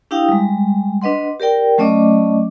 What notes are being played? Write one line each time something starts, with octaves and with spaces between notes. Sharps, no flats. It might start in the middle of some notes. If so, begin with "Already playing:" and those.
D4 E4 G4 F5 G5 D#6
G3 G#3
D4 B4 D#5 F#5 C6
G4 A#4 D5 G5
F#3 A3 C#4 D5 D#5 D6